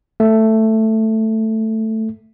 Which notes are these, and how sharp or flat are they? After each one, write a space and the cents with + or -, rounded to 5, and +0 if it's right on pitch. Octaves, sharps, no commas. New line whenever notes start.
A3 +5